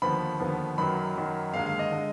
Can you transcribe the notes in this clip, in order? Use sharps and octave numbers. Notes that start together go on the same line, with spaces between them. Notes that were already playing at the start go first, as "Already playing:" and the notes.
D#2 D3 F3 B3 B5
D#2 D3 F3 B3
F#2 D#3 F#3 B5
F#2 D#3 F#3
D#2 D3 G#3 F5
F5
D#5
D3 G#3